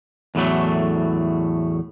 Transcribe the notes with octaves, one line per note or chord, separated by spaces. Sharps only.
E2 A2 F#3 A3